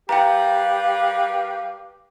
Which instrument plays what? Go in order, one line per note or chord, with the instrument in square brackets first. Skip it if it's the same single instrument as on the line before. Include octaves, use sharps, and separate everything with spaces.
[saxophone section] G3 A#4 B4 [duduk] G4 [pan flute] F5 [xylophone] G5 A#5